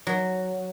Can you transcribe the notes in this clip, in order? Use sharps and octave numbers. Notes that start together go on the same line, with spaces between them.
F#3